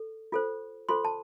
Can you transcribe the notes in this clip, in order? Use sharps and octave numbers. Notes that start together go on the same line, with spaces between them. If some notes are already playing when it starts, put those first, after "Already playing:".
Already playing: A4
F4 A4 C5
F4 A4 C5 C6
A5